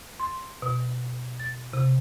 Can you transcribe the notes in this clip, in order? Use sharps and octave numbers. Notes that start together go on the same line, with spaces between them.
C6
B2
A6
C3